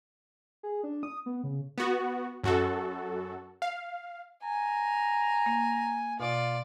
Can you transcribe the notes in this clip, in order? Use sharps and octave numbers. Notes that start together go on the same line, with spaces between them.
G#4
D4
D#6
B3
C#3
B3 F#4
F#2 F#4 A4
F5
G#5 A#5
A#3
B2 F4 D5